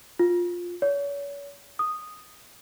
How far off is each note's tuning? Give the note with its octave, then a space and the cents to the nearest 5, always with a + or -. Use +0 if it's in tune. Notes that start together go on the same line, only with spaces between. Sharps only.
F4 +10
C#5 +40
D#6 -5